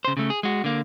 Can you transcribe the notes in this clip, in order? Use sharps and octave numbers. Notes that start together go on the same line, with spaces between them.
C#3 C5
C#3 A3
G#4
G#3 F#4
D3 A#3